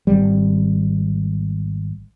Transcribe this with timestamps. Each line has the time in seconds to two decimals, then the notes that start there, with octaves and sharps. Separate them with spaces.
0.07 G#1 G3